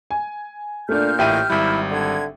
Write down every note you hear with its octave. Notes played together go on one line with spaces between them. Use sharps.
G#5
A#2 A3 D4 F6 G6
A1 A2 G4 E5 G5 D#7
G#1 G3 E4
D3 G#6